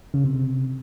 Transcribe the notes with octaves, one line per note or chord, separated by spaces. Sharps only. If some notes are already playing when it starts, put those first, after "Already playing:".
C#3
C3